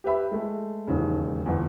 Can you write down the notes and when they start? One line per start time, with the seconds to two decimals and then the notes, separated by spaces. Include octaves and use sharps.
0.04 G4 B4 E5 B5
0.31 G#3 A3
0.87 E1 D#2 G#2 C#3
1.46 G1 E2